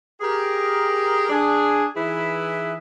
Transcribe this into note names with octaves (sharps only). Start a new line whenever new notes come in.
G4 G#4 A#4
D4 G#4
E3 D#4 E4 G#4 B4 E5